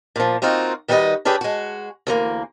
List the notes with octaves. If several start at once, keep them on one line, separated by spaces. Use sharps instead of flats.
A#2 F3
A#3 C4 D#4 F4 F#4
D#3 G3 F#4 B4 D#5
C#4 D4 G4 G#4 B4
G#3 F#4
D2 E3 A#3